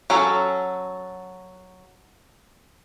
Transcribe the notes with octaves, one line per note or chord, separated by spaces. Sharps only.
F#3 C#4 A4